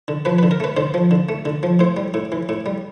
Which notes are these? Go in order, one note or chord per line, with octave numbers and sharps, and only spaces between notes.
D3
F3 B4
B4
D3
A#4
A3 B4
D3 C5
F3
D3
A3
D3
F3
A2 C5
G3
A2
E3
A2
G3